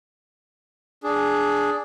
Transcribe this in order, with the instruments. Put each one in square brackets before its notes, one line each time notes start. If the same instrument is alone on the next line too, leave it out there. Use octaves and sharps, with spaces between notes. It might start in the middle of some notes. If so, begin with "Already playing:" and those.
[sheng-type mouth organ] D4 G#4